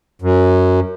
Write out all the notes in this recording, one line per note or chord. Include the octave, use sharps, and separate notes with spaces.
F#2